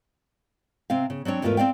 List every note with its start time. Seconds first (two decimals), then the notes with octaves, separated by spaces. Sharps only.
0.90 C3 C4 F5
1.10 C#3
1.25 F#3 C4 D4 C#5
1.42 E2 G#2 A3 F4 A#4 B4
1.57 C4 D4 D5 F5 G5